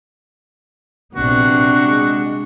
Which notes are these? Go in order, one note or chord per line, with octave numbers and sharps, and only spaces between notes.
A#1 C3 B3 D4 F#4
G#3